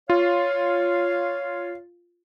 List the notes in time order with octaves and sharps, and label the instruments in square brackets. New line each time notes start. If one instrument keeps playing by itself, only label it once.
[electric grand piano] F4 [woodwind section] C#5 F5